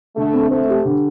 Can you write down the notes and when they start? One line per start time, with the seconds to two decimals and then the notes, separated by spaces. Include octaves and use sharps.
0.17 D3 A3
0.33 C4
0.50 A3 C5
0.68 G4
0.85 D3